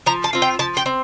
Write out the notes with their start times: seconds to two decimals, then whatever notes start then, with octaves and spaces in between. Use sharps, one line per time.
0.06 F3 A#5
0.24 A5
0.33 C4 F4
0.42 G5
0.59 F3 A5
0.77 G5
0.86 C4